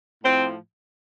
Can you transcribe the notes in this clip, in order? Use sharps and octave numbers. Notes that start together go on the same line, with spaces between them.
A2 F3 C4